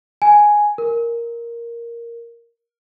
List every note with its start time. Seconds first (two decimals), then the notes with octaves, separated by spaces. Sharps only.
0.22 G#5
0.78 A#4